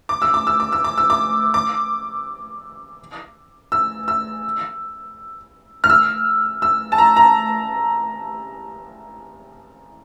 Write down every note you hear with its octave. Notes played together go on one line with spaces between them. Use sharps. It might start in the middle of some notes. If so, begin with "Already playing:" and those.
D6
E6
D6
E6
D6
E6
D6
E6
D6
D6
E6
E6
F6
E6
E6
A5
A#5
A#5